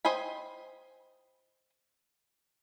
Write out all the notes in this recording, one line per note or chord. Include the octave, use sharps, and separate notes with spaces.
C5 D#5 G5 G#5 B5